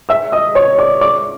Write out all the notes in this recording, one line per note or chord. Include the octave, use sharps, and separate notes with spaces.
E5 E6
D#5 D#6
C#5 C#6
D5 D6
D5 D6